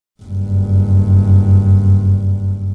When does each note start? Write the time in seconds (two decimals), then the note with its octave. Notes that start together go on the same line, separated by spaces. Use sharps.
0.23 F#1 G2